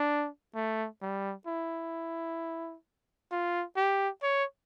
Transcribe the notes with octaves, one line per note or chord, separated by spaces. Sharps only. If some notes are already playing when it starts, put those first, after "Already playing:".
Already playing: D4
A3
G3
E4
F4
G4
C#5